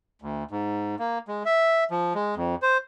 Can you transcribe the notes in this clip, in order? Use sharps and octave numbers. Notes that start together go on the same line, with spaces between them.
D2
G#2
A#3
G#3
E5
F3
G#3
F2
C5